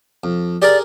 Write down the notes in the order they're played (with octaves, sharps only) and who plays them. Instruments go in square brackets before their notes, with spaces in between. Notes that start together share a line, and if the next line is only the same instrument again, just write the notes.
[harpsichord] F2
[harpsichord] G4 G#4 A#4 [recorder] D5